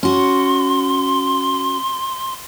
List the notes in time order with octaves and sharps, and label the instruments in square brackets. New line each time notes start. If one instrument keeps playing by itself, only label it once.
[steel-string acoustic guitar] C#4 F#4 [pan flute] C6